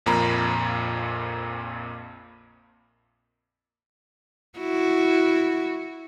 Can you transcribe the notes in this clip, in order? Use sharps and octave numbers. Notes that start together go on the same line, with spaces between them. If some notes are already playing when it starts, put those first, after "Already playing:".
A#1 F2 A#2 A#3 A#5 B5
E4 F#4